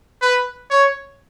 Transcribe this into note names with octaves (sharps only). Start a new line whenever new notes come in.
B4
C#5